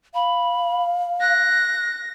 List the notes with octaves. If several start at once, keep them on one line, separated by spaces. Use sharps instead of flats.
F5 B5
F#6 A#6